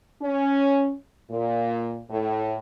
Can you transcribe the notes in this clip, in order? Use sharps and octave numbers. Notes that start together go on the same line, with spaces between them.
C#4
A#2
A2